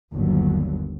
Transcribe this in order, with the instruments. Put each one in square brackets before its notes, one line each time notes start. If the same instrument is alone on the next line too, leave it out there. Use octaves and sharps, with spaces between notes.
[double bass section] G1 D#2 F#3